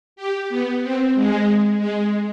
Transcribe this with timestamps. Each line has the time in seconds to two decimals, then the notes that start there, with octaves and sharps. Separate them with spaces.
0.16 G4
0.49 B3
0.82 C4
1.14 G#3
1.79 G#3